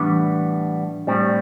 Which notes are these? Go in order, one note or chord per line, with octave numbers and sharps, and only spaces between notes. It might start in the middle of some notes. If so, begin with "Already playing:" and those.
Already playing: A2 E3 G3 B3 D4
A2 G3 C4